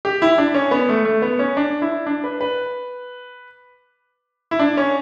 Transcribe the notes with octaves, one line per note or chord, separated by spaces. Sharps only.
G4
E4
D4
C#4
B3
A3
A3
B3
C#4
D4
E4
D4
B4
B4
E4
D4
C#4